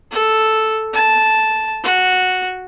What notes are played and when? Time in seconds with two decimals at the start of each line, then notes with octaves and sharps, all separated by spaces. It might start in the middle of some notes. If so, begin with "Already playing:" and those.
0.11 A4
0.94 A5
1.84 F#4